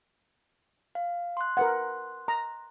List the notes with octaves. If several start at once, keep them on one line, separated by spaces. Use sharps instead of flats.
F5
C6 F#6
A#4 B4 F#5
A#5